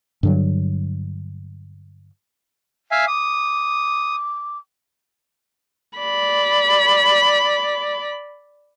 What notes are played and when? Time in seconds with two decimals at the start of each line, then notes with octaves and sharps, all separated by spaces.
0.23 G2 D3 F#3
2.91 E5 F5 G#5
3.08 D6 D#6
5.98 D5 B5